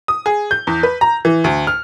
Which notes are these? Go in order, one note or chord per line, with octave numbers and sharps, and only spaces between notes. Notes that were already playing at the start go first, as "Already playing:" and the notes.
D#6
G#4
G6
E2
B4
A#5
E3
D2
F6